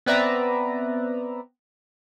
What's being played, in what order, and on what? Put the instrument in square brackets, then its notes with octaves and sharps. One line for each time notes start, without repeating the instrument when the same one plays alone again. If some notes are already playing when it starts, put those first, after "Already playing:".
[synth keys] B3 C4 B4 D5 E5 A#5